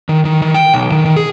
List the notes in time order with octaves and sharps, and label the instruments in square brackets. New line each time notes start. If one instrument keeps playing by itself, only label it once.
[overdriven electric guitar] D#3
D#3
D#3
G5
B1
D#3
D#3
G#4